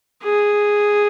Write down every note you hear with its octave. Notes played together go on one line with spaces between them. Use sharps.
G#4